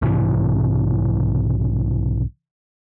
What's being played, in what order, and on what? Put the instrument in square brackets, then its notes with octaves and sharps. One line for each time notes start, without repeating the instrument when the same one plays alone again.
[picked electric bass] B1 G#2 C3 E3